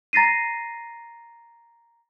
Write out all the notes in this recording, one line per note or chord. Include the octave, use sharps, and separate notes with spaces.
A#5 A6 A#6 C7 D#7